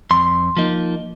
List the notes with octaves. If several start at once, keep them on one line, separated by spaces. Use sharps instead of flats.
F2 C6
F3 A#3 D#4